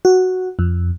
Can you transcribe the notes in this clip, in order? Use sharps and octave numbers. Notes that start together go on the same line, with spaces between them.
F#4
F2